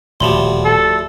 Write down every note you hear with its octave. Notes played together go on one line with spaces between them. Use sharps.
D#1 D2 A2 F3 G4 B5 C6
A4